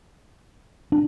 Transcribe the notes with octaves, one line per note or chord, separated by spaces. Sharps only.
D4